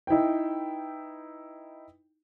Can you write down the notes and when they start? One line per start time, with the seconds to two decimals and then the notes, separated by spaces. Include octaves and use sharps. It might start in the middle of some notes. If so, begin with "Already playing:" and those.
0.07 D#4 E4 B4 G5